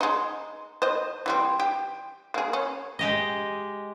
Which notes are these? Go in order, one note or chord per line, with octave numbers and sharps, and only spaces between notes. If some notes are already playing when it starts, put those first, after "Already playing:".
G#3 D#4
C5 D#5
E3 G3 C4
G4
A#3 G#4
C#4
G#3 G4 D#5